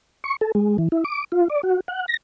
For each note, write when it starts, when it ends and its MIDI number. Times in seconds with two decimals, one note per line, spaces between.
0.24 0.36 85
0.41 0.52 69
0.55 0.77 56
0.78 0.88 52
0.92 1.04 64
1.05 1.24 86
1.32 1.48 65
1.50 1.61 74
1.63 1.80 66
1.88 2.06 78
2.08 2.17 94